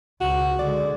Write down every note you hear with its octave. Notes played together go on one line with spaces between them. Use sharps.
C#2 F#4
D3 G#3 D5